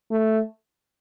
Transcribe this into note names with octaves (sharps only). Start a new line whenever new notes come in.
A3